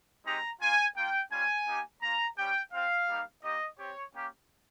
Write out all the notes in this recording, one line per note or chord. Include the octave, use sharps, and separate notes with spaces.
G#3 C4 D#4 G4 A#5
A#3 F4 G#5
A#3 F4 G5
G3 C#4 F4 G#5
A#3 D#4 G4
A#3 F4 A#5
G3 C#4 G4 G5
C4 F4 F5
G3 A#3 D#4 G4
A#3 D#4 G4 D#5
C4 G4 C#5
A#3 C#4 G4